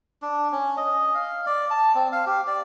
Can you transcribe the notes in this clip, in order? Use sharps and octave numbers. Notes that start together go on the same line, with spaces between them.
D4
C#4
D#5
F5
D5
A5
C4
F5
G4
D5